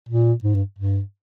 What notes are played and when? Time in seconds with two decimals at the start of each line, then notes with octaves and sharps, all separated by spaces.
0.09 A#2
0.44 G#2
0.55 G2
0.78 G2